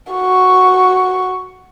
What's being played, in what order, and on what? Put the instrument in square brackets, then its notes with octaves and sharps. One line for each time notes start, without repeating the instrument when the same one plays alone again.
[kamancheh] F#4 C#6